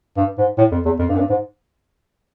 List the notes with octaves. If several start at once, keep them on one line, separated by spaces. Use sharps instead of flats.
G2
G#2
A2
F2
E2
F2
G2
F#2
G2
G#2